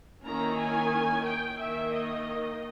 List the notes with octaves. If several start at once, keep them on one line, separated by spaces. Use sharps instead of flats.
D#3 A#3 C#4 E4 A#5
G#5
G5
D#3 A#3 D#4 E5
D#5